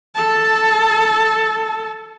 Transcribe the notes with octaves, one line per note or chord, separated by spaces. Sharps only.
A4 A5